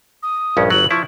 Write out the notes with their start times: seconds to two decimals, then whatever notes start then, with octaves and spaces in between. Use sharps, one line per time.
0.23 D#6
0.57 A#1 G2 C#4
0.70 G1 F#3 F#7
0.91 F3 E4 C#6